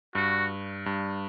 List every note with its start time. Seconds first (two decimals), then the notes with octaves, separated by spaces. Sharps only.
0.15 G2 F#4
0.86 G2